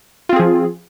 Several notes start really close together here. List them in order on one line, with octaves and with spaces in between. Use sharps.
F4 C4 G#4 F3